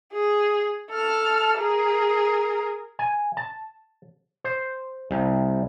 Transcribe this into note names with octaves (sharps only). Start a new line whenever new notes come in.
G#4
A4 F6
G#4 A#4
G#5
A5
C5
C2